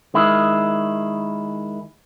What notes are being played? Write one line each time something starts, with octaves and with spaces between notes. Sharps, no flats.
D#3 G#3 E4